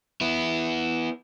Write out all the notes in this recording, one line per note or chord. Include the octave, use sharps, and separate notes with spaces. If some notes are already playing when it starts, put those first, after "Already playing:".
B3 E4